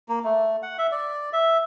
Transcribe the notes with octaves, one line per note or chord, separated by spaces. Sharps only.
A#3
A3
F#5
E5
D5
E5